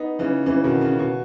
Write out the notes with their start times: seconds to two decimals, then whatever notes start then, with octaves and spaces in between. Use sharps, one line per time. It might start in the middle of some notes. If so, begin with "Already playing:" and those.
Already playing: B3 D#4
0.19 C#3 E3
0.46 C#3 E3
0.64 B2 D#3
0.81 C#3
0.99 B2